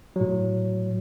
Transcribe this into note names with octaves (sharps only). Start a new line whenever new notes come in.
A2 F#3